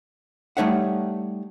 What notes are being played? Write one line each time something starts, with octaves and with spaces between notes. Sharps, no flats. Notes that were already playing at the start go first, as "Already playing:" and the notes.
G3 A3 D#4 C#5 E5 F#5